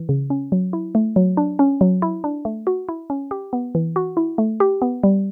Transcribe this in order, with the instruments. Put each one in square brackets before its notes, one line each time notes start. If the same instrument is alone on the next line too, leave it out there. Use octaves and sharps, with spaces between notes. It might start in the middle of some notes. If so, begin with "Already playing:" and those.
Already playing: [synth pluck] E3
C#3
C#4
F#3
E4
A3
F#3
D4
C#4
F#3
E4
D4
A3
F#4
E4
C#4
G4
B3
E3
F#4
E4
A3
G4
B3
G3